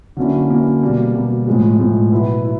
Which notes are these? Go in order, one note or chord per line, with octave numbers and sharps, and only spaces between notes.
D3 F#3 A#3 C#4 E4
D3 F#3 A#3 C#4 E4
B2 G3 A#3
B2 G3 A#3
A2 F3 G#3
A2 F3 G#3
B2 F#3 B3 E4
E4